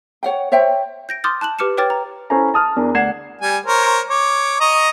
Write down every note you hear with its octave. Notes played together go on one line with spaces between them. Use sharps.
C#5 F#5 G5
C5 C#5 E5 G5
G6 A#6 D7
C6 D6 D#6 F6 G6 A6
A5 F#6 E7 F#7
G4 B4 D6 F6 C#7 E7
B4 C#5 G5 D6 F6 A6
A#5
C#4 E4 A4 C5 G#5 A#5
A5 D#6 F6
E2 D4 A#4
D2 D5 F#5 G#6 C7 E7
G3 G#5
A#4 C5 C#5
C#5 D6
D#5 A#5 C#6